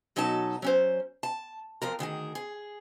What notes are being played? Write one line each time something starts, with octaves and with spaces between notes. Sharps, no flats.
B2 F#3 C#4 D#4 A4 A5
F#3 C#4 C5
A5
F2 F3 A#4
D2 D#3 G#4 A#4
G#4